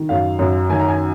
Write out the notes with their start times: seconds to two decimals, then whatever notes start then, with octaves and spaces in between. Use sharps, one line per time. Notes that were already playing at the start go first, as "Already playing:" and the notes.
Already playing: D#3
0.09 F#2 F5
0.39 F#2
0.70 D#3 G#5
0.80 A#5
0.88 G#5